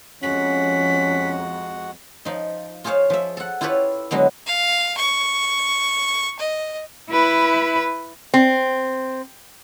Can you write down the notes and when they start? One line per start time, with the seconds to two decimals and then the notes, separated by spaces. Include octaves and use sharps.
0.23 F2 G#3 C#4 F#4 F#5 B6
2.25 F3 D#4
2.84 F4 G#4 C5 C#5 F5
3.10 F3 E5
3.37 A4 F#5
3.61 E4 F4 G4 A4 B4 C#5
4.11 D3 F#3 G#3 B3
4.46 F5
4.97 C#6
6.39 D#5
7.11 E4 B4
8.34 C4